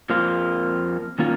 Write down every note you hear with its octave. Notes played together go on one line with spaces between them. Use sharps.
F2 F3 A#3 F4
D#3 A#3 C#4 F4